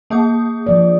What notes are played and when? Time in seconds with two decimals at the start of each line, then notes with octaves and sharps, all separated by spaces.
0.10 A#3 G#4 D#6
0.67 F3 D5